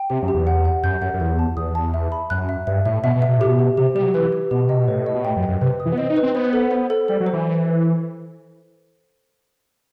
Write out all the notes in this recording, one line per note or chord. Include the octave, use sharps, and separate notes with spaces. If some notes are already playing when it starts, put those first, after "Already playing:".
Already playing: G5
C3 G4
F#2
G4
E2
F#5
F#5
F#2 G6
F#2 F#5
F#2
E2 G6
A5
E2 D#6
A5
E5
B5
F#2 F#6
E5
G2 E5
A2 E5
B2 E5
B2
E5
B2
A2 G4
B2
G4
C3 G4
G3 G4
F#3
E3 B4
G4
B2 G4
C3 D#5
B2
A2 B4
D#5
B2
A2 G5
F#2
G5
F#2
C3 B4
D#6
E3
B3
C4 D#5
D#4
B4
C4
B3 C5
A4
C5
A4
G3 A4
F#3
C5
E3